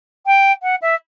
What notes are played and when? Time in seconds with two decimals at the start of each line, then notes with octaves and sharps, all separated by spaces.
0.26 G5
0.62 F#5
0.81 E5